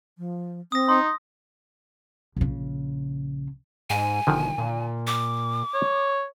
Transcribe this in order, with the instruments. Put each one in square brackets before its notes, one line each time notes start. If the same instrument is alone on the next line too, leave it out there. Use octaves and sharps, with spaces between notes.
[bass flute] F3
[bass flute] C4 [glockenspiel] D#6 A#6
[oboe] D#4 [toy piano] C6
[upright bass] A#1 C#3
[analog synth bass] G#2 [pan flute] G#5
[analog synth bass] E1 [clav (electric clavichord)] D3 D#3 F3
[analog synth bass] A#2
[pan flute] D6
[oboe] C#5